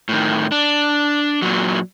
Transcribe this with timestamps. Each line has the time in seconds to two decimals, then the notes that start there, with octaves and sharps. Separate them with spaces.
0.09 A2 D#3
0.52 D4
1.42 A#2 F#3